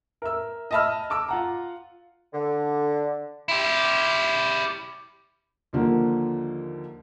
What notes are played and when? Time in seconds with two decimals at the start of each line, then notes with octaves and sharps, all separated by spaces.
0.22 A#4 E5 E6
0.71 D#5 E5 A5 B5 E6 F6
1.10 A5 D6 E6
1.28 F4 F#5 A#5
2.34 D3
3.48 E4 G4
5.73 D#2 D3 F3 A#3